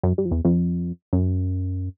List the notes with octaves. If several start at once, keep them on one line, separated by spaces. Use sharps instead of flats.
F#2
G2
F2
E2
F2
F#2